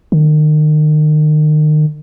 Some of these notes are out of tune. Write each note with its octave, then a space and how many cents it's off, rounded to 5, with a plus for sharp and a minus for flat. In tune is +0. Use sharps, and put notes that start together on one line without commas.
D#3 -35